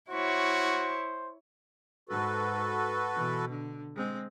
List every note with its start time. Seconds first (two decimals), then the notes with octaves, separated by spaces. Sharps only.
0.10 E4 F#4 C5 C#5
2.09 G#2 F#4 A4 B4
3.15 B2 E3
3.50 D3
3.96 G#3 C4